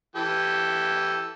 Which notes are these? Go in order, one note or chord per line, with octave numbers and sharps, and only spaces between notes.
E3 G4 A4